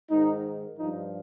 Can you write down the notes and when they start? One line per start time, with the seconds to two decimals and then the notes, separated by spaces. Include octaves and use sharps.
0.10 G#2 D#3 D#4
0.77 G2 F3 D#4